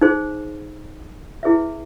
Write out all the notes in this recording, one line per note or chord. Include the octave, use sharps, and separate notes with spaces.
D#4 G#4 C5
E4 G#4 B4 E5